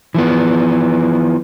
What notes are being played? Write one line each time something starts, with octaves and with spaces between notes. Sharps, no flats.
E3 F3 B3